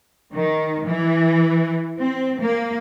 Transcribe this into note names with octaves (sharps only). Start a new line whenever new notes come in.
D#3
E3
C4
A#3